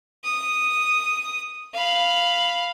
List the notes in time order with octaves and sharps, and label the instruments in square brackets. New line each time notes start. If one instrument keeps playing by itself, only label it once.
[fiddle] D#6
F5 B5